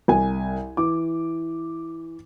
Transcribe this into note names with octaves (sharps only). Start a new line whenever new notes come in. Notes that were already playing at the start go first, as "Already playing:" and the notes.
C2 G#5
E3 D6